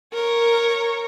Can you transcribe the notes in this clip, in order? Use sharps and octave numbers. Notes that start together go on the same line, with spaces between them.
A#4 C#5